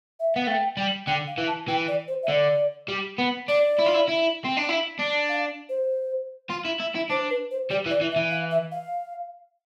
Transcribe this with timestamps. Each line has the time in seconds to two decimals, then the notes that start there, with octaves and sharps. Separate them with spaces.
0.20 E5
0.34 B3 F5
0.47 A3 G5
0.77 G3
1.07 D3 G5
1.28 F5
1.38 E3
1.48 A5
1.68 E3 G5
1.88 D5
2.08 C5
2.23 E5
2.28 D3 D5
2.88 G3
3.18 B3
3.48 D4 D5
3.79 E4
3.87 F4
3.95 E4
4.08 E4
4.45 C4
4.57 D4
4.69 E4
4.99 D4
5.29 F5
5.69 C5
6.50 F4
6.65 E4
6.80 E4
6.95 E4
7.10 D4 C5
7.30 B4
7.51 C5
7.70 G3 D5
7.86 E3
7.90 D5
8.01 E3
8.11 E5
8.16 E3
8.31 F5
8.51 E5
8.72 F5